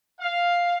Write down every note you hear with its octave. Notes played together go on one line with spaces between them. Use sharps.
F5